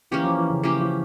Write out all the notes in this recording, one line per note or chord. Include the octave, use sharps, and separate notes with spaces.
E3 A#3 C#4 G4
F3
E3
C#3
E3 A#3 C#4 G4
F3